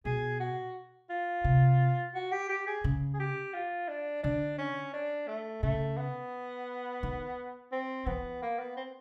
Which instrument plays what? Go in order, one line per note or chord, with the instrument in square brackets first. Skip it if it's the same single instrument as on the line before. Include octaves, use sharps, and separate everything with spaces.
[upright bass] B2 [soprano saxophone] G#4
[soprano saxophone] F#4
F4
[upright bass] C3
[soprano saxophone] F#4
G4
G4
G#4
[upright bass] C#3
[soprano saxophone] G#4
G4
F4
D4
[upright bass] D3 [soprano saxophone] D4
[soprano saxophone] C#4
D4
A3
[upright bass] C#3 [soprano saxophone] A3
[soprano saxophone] B3
[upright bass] D#3
[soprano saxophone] C4
[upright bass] E3 [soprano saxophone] B3
[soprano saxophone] A#3
B3
C4